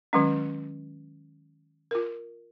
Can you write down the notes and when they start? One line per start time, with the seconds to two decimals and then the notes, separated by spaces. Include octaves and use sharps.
0.13 D#3 F#3 G#3 C#4
1.91 F4 A#4